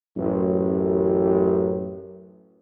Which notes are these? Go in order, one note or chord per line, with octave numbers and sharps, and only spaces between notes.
A1 F#2